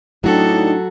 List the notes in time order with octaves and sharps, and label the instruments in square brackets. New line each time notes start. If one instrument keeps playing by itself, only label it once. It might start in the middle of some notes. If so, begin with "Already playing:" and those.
[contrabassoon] A2 [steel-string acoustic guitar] F#3 F#4 [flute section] D4 D#4 G5 [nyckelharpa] A4